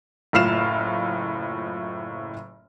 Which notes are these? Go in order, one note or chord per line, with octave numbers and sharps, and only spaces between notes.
F#1 A2 F4 F6 C7 E7